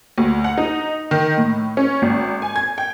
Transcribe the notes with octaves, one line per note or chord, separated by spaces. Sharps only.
D2
F#5
D#4
D#3
A2
C#4
G#1
G#5
G#6
G5